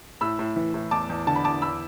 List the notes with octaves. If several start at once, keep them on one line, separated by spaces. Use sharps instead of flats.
A2 B5 E6
A2
E3
A2
E2 A5 D6
E2
D3 A5
B5
E2 A5 D6
E2 B5 E6